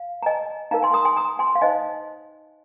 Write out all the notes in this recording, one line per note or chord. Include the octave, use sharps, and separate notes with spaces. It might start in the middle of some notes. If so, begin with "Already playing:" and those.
Already playing: F5
A#5
D#5 G#5
D#4 A#4 F5 A#5
G#5 C6
A#5 D#6
G#5 C6
A#5 D#6
G#5 C6
F5
D#4 C5 D#5 G#5